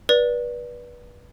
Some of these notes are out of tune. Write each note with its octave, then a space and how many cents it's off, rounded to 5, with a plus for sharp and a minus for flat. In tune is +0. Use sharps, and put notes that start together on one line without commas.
B4 -25 D5 +0